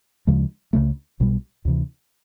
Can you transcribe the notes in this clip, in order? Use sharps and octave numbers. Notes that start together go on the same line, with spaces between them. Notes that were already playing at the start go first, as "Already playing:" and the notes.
D2 C#3 F3 G#3
C#2 C#3 F3 A3
B1 B2 G3
D2 C3 E3